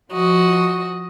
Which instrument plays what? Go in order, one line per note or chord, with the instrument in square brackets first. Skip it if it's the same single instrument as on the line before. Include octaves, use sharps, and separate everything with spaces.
[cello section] F3 [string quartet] F#4 D#5